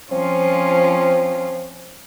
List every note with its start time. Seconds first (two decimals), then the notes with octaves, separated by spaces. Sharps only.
0.12 F3 C4 C#4 F4